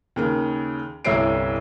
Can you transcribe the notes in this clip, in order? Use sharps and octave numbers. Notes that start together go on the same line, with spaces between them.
D#2 C#3 A#4
G1 C2 E4 C#5 C7 D7